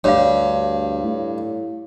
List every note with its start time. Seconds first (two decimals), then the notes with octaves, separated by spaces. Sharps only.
0.04 D2 G2 C#5 F5
1.04 A2